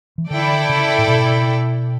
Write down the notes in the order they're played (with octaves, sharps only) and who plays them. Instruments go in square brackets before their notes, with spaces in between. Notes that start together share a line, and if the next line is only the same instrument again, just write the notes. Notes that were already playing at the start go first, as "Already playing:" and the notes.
[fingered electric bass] E3
[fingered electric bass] D3 [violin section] E4 A4 D5 G5
[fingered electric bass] C#3
A2
B2